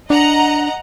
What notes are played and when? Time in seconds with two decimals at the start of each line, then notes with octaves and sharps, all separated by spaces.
0.10 D4 D#5 F#5 A#5